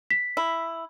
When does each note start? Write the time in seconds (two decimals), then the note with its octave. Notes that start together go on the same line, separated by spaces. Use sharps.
0.11 B6
0.37 E4